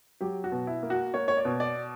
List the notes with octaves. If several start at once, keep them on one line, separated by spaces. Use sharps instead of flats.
F#3 G4
F#4
B2
E4
A#3
F#4
A#3 C#5
C#5
D5
B2
D5